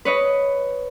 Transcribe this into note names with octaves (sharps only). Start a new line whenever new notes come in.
B4 C#5 D#5